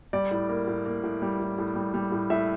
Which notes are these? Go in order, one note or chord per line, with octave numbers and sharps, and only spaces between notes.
G3 D5
A2
A#3
A2
A#3
A2
G3
A2
A2
G3
G3
A2
A2 E5